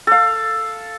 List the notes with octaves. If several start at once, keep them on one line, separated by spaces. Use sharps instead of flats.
A4 F5